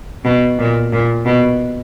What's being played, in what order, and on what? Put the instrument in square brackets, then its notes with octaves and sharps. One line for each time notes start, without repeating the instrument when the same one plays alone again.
[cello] B2
A#2
A#2
B2